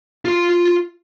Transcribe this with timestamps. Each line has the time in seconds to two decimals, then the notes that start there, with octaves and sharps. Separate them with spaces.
0.25 F4 C6